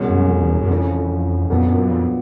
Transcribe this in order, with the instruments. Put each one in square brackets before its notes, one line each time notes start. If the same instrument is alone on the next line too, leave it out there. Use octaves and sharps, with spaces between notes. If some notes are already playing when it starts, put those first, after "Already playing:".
Already playing: [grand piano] C2 B2 G#3 C#4
[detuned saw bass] F#2
F2
E2
F#2
[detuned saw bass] F2 [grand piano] C#3 E3 A3 C#4
[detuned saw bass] F2 [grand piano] A#2 F#3 B3 D4
[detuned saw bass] F#2
F2